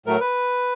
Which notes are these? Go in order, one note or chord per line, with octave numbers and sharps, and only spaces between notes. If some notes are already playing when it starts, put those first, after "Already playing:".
A2 F#3 A3 A#4
B4